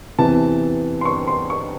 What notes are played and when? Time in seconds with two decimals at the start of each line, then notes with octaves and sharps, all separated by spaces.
0.19 E2 C3 E3 A5
1.01 C6
1.05 C#6
1.27 C6
1.50 C#6